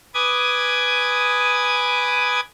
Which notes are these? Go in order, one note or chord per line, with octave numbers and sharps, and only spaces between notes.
B4 G#5 D6 D#6 G#6